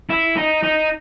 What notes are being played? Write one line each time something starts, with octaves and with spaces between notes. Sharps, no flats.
E4
D#4
D#4